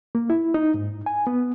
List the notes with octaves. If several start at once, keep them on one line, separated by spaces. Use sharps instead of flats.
A#3
E4
D#4
G#2
G#5
B3